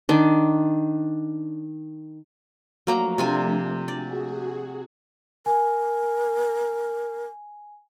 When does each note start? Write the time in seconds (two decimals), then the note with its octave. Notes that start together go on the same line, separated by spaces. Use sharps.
0.09 D#3 D4
2.87 F3 F#3 A3 A#3 D4 A#5
3.18 C3 F4 G#5
3.88 F#4 G#4 D5
5.46 A#4 G#5